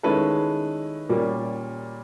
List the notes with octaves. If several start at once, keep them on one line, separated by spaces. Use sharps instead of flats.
D#3 G#3 C#4 E4 A4 B4
A#2 G3 A#3 C#4